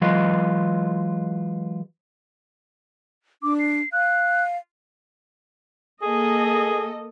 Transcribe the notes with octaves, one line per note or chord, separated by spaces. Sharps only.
E3 F#3 G#3 F4 B4 D#5
D4 D6
C7
F5 F#6
A#3 G#4 A4 D#5